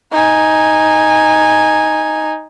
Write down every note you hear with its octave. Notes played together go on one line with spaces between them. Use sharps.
D#4 G#5